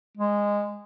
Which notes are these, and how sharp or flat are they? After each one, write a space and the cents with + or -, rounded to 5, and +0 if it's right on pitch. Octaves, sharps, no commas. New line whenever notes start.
G#3 -15